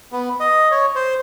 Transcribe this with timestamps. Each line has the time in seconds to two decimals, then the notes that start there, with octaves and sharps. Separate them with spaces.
0.12 B3
0.40 D#5
0.71 C#5
0.95 C5